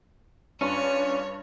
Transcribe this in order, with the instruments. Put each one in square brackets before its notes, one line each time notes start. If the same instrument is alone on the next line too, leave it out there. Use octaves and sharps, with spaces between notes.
[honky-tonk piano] G2 [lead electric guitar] C#4 [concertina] F4 B4 D5 [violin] C#5